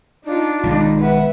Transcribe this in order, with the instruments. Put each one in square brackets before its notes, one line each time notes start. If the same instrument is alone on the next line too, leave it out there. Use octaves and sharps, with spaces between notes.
[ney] D4 [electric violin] D#4 F4
[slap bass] B1 D#3 G#3 [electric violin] D#4
[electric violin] B4 E5 [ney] F#5